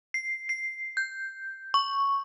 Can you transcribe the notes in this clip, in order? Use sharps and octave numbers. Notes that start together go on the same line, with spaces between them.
C7
C7
G6
C#6